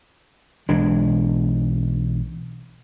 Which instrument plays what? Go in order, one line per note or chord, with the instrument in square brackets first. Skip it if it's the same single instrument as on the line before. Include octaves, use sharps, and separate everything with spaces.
[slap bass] B1 E3 G#3 D4